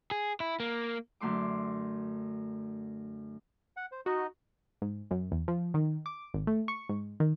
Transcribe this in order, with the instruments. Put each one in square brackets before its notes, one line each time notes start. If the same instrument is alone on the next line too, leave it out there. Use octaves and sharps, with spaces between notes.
[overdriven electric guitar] G#4
E4
A#3
[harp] F#2 D3 A3 C6 D6
[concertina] F#5
C5
[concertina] D#4 D#5 [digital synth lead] F#4
[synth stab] G#2
F#2
E2
F3
D#3
D6
G#1
A3
C#6
G#2
D#3